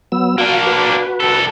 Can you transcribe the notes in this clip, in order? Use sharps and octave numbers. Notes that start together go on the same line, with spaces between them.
F#3 B3 E6
A#3 D4 F#4 F5
F#4 B4
C2 A4